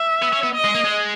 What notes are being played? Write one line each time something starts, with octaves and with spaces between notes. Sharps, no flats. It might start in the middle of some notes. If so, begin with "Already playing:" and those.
Already playing: E5
B3
C#4
B3
D#5
G#3
A#3
G#3